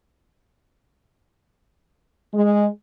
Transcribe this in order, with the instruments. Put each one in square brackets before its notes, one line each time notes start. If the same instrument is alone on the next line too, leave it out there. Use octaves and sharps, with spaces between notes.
[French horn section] G#3